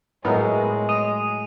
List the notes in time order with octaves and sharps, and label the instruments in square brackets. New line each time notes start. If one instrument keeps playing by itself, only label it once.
[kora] A2 F#3 E5 [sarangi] G#3 [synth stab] B3 D#4 A#4
[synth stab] D#5 [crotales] D#6 D#7